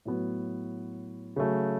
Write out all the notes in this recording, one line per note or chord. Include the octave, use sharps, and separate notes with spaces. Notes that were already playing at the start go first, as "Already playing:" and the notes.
A2 F#3 B3
C#3 F#3 A3